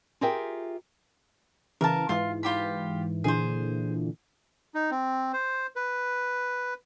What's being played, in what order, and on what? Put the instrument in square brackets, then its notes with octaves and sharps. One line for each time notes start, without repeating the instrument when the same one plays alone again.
[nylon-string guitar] F4 G4 G#4 A#4 E5 G5
[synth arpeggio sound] C#3 E3 [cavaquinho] A#4 F5 A5
[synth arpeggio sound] G#2 E3 [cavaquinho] F4
[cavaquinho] F4 G4 B5
[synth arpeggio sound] A#2 D3 E3 [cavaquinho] G#4 C5
[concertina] D#4
C4
C5
B4